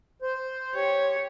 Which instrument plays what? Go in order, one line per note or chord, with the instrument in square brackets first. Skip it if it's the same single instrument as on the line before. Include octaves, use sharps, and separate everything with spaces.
[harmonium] C5
[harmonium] G4 [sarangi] C#5